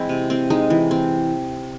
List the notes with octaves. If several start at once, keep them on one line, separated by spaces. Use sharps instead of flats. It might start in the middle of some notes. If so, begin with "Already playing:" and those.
Already playing: E3 G#3 C4 E4
C3
C4
G#3 D#4
E3
C4